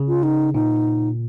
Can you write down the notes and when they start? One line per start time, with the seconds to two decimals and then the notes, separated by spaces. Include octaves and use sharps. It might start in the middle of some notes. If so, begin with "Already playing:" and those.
Already playing: C#3
0.08 F4
0.23 D#4
0.54 A#2 D#4